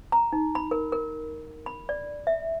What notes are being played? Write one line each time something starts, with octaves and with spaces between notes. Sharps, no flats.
A#5
D#4
B5
A#4
A#4
B5
D5
E5